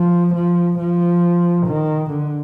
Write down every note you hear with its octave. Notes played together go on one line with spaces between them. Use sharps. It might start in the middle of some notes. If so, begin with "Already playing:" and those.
Already playing: F3
F3
F3
D#3
D3